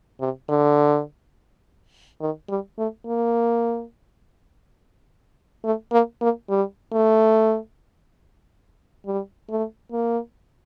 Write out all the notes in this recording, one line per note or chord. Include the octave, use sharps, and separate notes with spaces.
C3
D3
D#3
G3
A3
A#3
A3
A#3
A#3
G3
A3
G3
A3
A#3